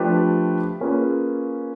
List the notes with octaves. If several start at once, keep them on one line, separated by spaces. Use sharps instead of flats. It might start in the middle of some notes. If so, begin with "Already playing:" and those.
Already playing: F3 A3 D4 G4 B4
A#3 C#4 F4 G#4 B4